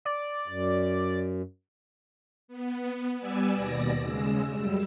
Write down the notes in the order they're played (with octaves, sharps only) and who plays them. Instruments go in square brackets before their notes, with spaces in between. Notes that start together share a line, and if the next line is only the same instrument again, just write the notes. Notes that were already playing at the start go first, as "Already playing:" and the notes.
[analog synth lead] D5
[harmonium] F#2
[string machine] B3
G3 B3 D5 G#5 E6
D#2 B2 D5 A#6
C#3 G#3 E6
F#2 G3 E6